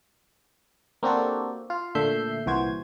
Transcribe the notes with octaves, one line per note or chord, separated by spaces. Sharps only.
A#3 C4 D4 F#4 G4 A4
F4 F5
A#2 D3 A3 E5 G6 C7
C2 A#2 E3 F#4 C5 G#6